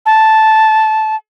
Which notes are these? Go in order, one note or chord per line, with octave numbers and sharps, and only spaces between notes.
A5